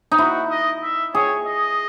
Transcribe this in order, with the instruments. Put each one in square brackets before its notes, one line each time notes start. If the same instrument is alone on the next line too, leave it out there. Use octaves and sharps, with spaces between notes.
[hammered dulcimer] D#4
[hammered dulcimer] E4 [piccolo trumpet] F#4
[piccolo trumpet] D#5
E5
[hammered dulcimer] G#4 [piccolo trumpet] C#5
[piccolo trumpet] D#5